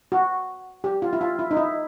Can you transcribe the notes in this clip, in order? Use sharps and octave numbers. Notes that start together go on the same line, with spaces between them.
F#4
G4
F4
E4
F4
E4
D#4
E4